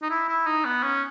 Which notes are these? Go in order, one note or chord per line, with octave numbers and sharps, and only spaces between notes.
D#4
E4
E4
D#4
B3
C#4